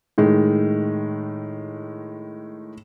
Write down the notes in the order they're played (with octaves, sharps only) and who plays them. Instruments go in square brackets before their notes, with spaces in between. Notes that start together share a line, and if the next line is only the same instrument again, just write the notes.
[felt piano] A2 D#3 G#3